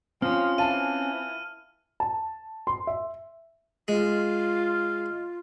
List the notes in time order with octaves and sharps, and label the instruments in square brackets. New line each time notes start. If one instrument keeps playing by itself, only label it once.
[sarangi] F3 [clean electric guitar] C4 C#4 [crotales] F6
[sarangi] E3 [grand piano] F5 A5 [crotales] D#7
[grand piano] A5
C6
E5
[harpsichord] G#3 [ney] F4